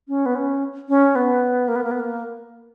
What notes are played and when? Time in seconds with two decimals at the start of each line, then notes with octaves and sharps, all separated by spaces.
0.08 C#4
0.26 B3
0.35 C#4
0.89 C#4
1.15 B3
1.68 A#3
1.76 B3
1.84 A#3
1.91 B3
2.00 A#3